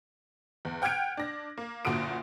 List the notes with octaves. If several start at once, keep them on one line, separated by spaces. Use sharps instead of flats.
E2
F#5 G5 F6 G6 G#6 D7
D4 A#6
A#3
F#1 A#2 D3 F#4 D#6 D7